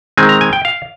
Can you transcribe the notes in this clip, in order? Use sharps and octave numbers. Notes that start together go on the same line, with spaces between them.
D#3 G#3 C4 G#5
A#5
G#5
G5
F5